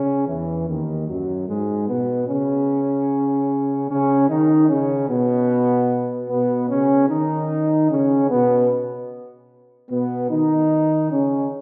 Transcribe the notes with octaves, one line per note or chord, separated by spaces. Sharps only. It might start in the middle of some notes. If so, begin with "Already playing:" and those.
Already playing: C#3 C#4
E2 E3
D#2 D#3
F#2 F#3
G#2 G#3
B2 B3
C#3 C#4
C#3 C#4
D#3 D#4
C#3 C#4
B2 B3
B2 B3
C#3 C#4
D#3 D#4
C#3 C#4
B2 B3
B2 B3
D#3 D#4
C#3 C#4